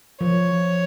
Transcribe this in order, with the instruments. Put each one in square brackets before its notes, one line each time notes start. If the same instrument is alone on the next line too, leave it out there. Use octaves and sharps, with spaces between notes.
[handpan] F3 [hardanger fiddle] C#5